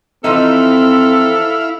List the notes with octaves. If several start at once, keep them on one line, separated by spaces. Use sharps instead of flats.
E3 F3 C4 D#4 E4 A4 F5